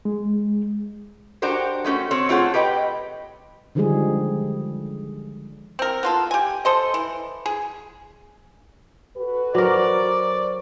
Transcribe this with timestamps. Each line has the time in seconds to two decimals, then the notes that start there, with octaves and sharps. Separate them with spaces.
0.05 G#3
1.42 D4 F#4 G4 A#4 C5
1.84 G#3 A3 C#4 F#4
2.11 C4 C#5
2.29 A3 C4 F4 G#4 C#5 F#5
2.54 G4 B4 D#5 F#5 G5
3.75 D3 D#3 F3 G3 G#3 G#4
5.79 C4 A#4
6.03 B3 F4 A4
6.31 G4 G#5
6.65 A4 C5 D#5
6.94 E3
7.46 G#4
9.17 F#4 A4 B4
9.55 F#3 A#4 C5 D5 C#6